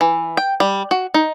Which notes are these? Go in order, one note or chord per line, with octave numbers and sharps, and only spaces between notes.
E3
G5
G3
F#4
D#4